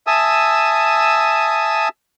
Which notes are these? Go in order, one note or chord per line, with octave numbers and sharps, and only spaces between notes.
E5 G#5 A5 D#6 E6